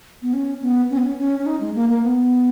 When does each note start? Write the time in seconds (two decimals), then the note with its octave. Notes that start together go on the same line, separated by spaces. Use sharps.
0.22 B3
0.33 C#4
0.62 B3
0.90 C#4
0.98 B3
1.05 C#4
1.18 C#4
1.39 C#4
1.46 D#4
1.61 G#3
1.75 A#3
1.89 A#3
2.03 B3